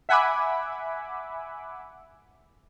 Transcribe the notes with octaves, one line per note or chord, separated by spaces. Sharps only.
E5 F#5 G#5 B5 D6